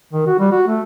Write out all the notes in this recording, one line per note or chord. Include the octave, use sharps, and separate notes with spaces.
D#3
F#4
G3
F#4
A3